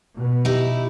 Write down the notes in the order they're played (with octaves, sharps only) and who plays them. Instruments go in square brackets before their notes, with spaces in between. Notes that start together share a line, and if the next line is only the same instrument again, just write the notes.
[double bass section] B2
[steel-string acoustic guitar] D#4 E4 G4